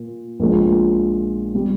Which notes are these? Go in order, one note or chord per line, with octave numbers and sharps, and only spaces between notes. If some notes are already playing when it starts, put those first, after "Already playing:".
Already playing: A#2
A#1 A#2 G#3
G3